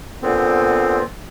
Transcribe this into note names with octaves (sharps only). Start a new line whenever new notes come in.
A#2 D3 B3 C4